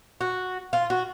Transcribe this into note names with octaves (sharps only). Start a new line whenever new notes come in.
F#4
F4
F#4